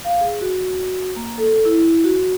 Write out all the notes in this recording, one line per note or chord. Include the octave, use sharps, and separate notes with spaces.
F5
G#4
F#4
A#3
A4
E4
F#4